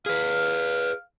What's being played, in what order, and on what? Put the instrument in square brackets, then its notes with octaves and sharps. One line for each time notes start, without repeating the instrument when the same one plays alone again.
[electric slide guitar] G#4 B4 [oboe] F5